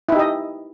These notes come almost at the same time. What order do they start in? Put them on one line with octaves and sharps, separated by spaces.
E4 D#4 G4 D#5